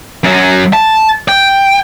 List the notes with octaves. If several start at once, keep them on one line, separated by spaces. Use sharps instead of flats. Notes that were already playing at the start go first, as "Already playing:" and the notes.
F#2 F#3
A5
G5